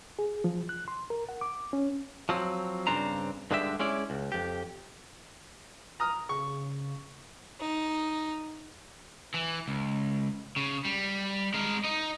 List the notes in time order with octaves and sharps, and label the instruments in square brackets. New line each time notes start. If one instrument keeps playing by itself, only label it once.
[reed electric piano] G#4
F3
F#6
C6
A#4
F#5
D6
C#4
[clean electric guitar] F3 F#3 C4
G2 C#3 C4 D4 C5 A#5
G2 D3 G#3 D4 G4 E5
G#3 C#4 E4 D5
C#2
F2 G4
[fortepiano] A#5 D#6 F6
[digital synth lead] C#3 [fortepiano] C#6
[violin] D#4
[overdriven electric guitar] E3
C#2
C#3
G3
G#3 A#4
D#4 D#5